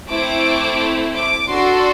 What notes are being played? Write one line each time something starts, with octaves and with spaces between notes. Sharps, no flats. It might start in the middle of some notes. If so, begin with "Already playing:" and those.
A3 C4 E4 D6
D6
D4 F#4 A4 C6